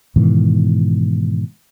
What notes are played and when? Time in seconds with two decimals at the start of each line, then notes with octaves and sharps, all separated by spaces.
0.16 G#2 B2 D#3 E3